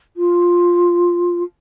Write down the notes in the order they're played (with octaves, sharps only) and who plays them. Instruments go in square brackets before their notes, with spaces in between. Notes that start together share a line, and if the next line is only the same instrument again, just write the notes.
[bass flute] F4